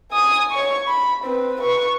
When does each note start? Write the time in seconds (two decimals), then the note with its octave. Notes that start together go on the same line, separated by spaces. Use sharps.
0.12 G#5 D#6
0.52 C#5 C#6
0.88 B5
1.24 C4 B4
1.61 B4 C#6